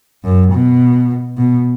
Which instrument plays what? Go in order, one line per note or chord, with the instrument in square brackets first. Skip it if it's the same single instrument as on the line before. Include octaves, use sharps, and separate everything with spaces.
[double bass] F#2
B2
B2